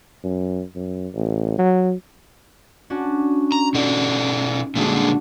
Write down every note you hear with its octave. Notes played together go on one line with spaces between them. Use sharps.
F#2
F#2
A1
F#3
C#4 D4 F#4
A#5
B2 D#4 A4 D5
A#2 D3 G3 G#3 D4 F#4